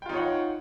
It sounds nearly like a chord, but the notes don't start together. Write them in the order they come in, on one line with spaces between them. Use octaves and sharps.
G5 F4 D#4 C#5 F#5